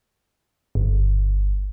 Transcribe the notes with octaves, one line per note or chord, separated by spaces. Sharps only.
G1